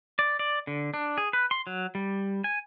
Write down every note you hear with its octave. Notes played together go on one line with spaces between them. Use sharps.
D5
D5
D3
D4
G#4
B4
C6
F#3
G3
G#5